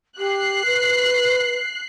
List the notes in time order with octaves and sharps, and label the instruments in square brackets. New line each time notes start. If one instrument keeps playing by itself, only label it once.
[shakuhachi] G4 [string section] F#6 C7
[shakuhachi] B4